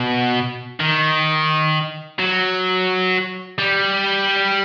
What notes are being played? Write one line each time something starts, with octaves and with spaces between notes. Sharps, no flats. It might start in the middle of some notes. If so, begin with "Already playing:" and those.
Already playing: B2
D#3
F#3
G3